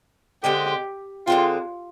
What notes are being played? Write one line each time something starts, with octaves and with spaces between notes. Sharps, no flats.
D3 G#3 C4 G4
D3 G#3 C4 F4